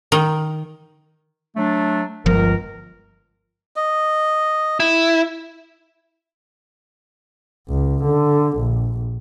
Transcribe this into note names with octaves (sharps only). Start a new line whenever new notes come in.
D#3
F#3 A3 D4
G1 C#2 F3 A#4
D#5
E4
C#2
D3
A#1